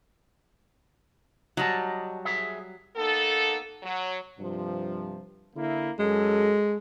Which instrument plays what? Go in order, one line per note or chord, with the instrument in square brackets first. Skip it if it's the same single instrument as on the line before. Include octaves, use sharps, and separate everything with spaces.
[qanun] F#3 G3 [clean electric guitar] D#5 A5
[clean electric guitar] G#4 E5
[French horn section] A#3 B3 D#4 A4
F#3
[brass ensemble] G2 C3 F3
D3 A#3 E4
[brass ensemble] F#2 A4 [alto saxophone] G#3